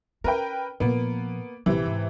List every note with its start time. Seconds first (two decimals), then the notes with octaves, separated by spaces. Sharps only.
0.24 C#4 A#4 B4 G5
0.80 A#2 F3 A#3 B3
1.66 A#1 C3 E3 C#4
1.86 G#2